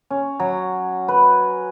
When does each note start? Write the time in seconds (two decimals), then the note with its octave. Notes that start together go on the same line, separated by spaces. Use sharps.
0.10 C#4
0.40 F#3
1.08 B4